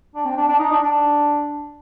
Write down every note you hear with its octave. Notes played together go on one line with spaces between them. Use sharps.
D4
C4
D4
D4
D#4
D4
D4